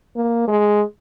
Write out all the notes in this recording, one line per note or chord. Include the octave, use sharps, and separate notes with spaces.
A#3
G#3